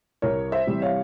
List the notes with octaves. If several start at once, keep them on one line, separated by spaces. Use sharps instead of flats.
C2 A#4 C#5
C5 E5
C3 E3 G3
C#5 F5